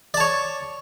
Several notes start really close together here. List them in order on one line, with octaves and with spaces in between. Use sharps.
D5 A5 C#5